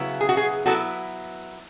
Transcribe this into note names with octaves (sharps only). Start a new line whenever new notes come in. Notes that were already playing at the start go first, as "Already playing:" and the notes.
Already playing: C#3 F#3 B3 E4
G#4
F#4
G#4
F#3 B3 E4 F#4 A4